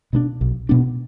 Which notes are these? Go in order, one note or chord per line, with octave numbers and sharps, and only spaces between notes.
B2 B3 D4
B1
B2 B3 D4